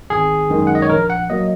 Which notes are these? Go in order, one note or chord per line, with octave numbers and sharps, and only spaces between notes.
G#1 G#4
F#2 D#3 G#3
F#5
D#5
C#5
A#1 A#4
F#5
F#3 A#3 D#5